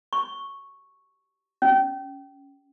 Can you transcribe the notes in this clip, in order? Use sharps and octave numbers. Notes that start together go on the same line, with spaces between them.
C#6
C#4